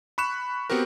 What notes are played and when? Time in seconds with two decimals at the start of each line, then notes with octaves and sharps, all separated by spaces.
0.18 B5 C#6 F#6 E7
0.70 B3 C4 F#4 G4 A#4